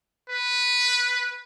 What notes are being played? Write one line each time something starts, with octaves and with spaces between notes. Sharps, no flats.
B4